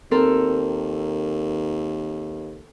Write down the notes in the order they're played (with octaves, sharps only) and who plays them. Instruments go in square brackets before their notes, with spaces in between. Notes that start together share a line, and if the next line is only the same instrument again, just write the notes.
[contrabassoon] D#2 [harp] C4 A4 A#4